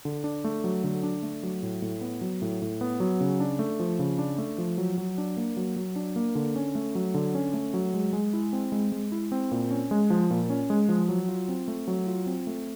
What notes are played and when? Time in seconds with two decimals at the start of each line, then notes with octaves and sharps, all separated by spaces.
0.05 D3
0.24 D4
0.44 A3
0.64 F#3
0.84 D3
1.03 D4
1.23 A3
1.43 F#3
1.63 A2
1.82 A2
2.01 B3
2.21 F#3
2.42 A2
2.62 A2
2.81 B3
3.00 F#3
3.21 C#3
3.40 D4
3.59 A3
3.80 F3
3.99 C#3
4.19 D4
4.38 A3
4.58 F3
4.78 F#3
4.98 F#3
5.18 D4
5.37 A#3
5.57 F#3
5.76 F#3
5.96 D4
6.16 A#3
6.35 D3
6.56 C#4
6.75 A3
6.95 F#3
7.14 D3
7.35 C#4
7.54 A3
7.74 F#3
7.94 G#3
8.13 G#3
8.33 E4
8.53 C4
8.72 G#3
8.92 G#3
9.12 E4
9.32 C4
9.51 A#2
9.71 C#4
9.91 G#3
10.10 F3
10.31 A#2
10.50 C#4
10.70 G#3
10.89 F3
11.09 F#3
11.29 F4
11.49 C4
11.68 A3
11.88 F#3
12.07 F4
12.27 C4
12.47 A3